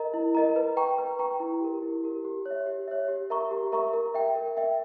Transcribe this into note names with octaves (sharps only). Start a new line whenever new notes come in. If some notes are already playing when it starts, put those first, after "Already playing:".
Already playing: A#4 D#5 A#5
E4
A#4 D#5 A#5
B4
G5 A#5 C#6
B4
G5 A#5 C#6
E4
G4 A#4
E4
G4 A#4
G4
C#5
E5
G4
C#5 E5
G4
A#4 E5 A#5 C#6
G4
A#4 E5 A#5 C#6
A#4
E5 G5
A#4
E5 G5